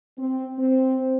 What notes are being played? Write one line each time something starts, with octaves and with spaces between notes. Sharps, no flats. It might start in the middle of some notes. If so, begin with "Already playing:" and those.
C4
C4